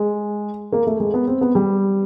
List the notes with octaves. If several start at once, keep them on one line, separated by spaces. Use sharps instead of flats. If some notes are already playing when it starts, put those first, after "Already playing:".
Already playing: G#3
A#3
A3
G#3
B3
C4
B3
G3